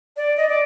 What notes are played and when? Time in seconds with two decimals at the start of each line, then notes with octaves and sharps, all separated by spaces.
0.17 D5
0.37 D#5
0.49 D5